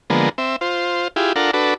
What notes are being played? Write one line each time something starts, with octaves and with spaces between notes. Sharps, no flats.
D3 F3 G#3 A#3 B3
C4 E5
F4 C5
E4 F4 G4 G#4
D4 F4 A4 A#4 F#5
D4 F#4 A4 B4